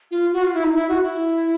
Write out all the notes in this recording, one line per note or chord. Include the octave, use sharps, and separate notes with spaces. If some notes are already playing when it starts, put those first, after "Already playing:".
F4
F#4
F4
E4
D#4
E4
F#4
E4